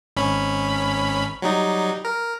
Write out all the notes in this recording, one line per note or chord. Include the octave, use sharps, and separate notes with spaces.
G#1 C#4 B5
F#3 G3 D#4
A#4